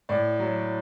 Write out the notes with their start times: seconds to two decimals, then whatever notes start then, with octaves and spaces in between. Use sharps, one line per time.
0.09 A2 D5
0.39 F#3